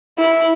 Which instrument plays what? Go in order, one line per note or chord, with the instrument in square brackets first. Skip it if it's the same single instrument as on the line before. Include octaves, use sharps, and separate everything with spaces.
[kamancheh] E4